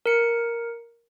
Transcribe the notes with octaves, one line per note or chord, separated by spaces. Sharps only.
A#4 C#7